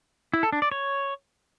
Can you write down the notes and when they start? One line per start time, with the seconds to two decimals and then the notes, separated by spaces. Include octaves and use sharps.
0.34 E4
0.43 A4
0.53 D4
0.62 D5
0.72 C#5